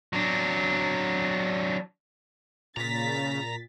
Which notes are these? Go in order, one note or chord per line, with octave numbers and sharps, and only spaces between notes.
F#3 D4
A#2 C#3 A#5 A6 B6